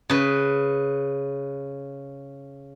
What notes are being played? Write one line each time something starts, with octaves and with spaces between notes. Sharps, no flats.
C#3 B4